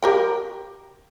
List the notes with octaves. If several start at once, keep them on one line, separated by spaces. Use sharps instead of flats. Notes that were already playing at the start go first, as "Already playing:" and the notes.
G4 A#4 G5